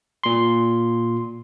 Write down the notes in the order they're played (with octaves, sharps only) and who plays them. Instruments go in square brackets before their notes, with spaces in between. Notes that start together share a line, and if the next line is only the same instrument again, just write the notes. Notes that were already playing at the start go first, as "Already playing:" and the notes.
[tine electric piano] A#2 C6